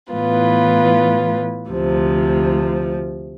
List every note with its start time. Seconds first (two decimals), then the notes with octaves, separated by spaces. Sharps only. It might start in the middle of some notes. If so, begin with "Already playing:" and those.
0.12 A2 E3 B3 F4 B4
1.69 D2 C3 F3